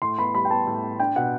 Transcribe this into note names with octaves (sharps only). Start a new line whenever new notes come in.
A2 C6
B3 B5
G3 B5
G5
B3 A5
A2
B3
D4 G5
B2 F#5